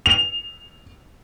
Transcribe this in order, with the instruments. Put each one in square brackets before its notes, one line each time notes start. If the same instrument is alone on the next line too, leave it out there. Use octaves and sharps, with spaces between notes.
[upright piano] F7